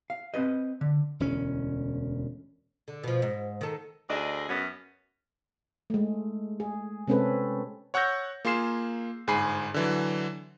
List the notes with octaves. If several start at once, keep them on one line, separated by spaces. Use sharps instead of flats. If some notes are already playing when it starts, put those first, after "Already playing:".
F5
C4 B4 D#5
D3
E1 D2 C#4
D3
B2 F3
G#2
D#3 A4
D2 G#4 D5 D#5
F#2 B3 C#4
G#3 A3
G#4
C3 G#3 C4 C#4 A4 B4
C#5 F#5 C#6 E6 G6 A#6
A#3 F4 G#4 C6 C7 E7
G1 G#2 G#4 G#5 B5 C7
D3 E3 F#3